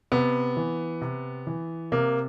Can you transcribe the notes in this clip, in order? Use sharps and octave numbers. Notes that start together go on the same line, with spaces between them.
C3 B3
E3
C3
E3
C3 A#3